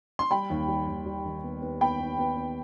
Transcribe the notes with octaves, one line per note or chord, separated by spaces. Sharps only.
C6
G3 G5 B5
D#2
G3
D#2
G3
D#3
B3
B3
B3 G5 B5
B3
B3
B3